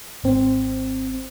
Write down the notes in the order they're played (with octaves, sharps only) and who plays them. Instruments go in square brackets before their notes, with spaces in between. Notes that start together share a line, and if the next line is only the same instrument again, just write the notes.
[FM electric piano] G#1 C4